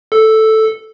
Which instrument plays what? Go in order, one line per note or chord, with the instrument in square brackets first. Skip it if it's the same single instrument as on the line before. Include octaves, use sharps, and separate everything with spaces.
[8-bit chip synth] A4